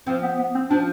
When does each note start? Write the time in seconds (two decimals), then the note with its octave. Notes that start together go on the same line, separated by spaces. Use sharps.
0.07 F3 C4
0.23 B3
0.38 B3
0.55 C4
0.70 F3 D4